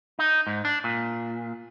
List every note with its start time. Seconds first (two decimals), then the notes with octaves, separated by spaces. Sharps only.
0.19 D#4
0.47 G#2
0.65 D4
0.84 A#2